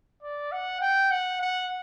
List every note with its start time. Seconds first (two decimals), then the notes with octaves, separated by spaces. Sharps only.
0.23 D5
0.52 F#5
0.81 G5
1.11 F#5
1.42 F#5